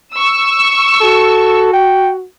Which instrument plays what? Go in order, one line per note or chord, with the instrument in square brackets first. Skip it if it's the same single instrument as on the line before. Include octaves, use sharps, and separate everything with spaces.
[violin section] C#6 E6
[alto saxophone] F#4 [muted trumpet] A4
[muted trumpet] G5